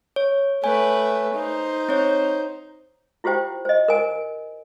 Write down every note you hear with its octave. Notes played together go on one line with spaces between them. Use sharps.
C#5
A3 B4 C#5 G#5
D#4 C5
C4 C#5
E4 F4 G4 C5 G5
C5 D#5
A#4 G#5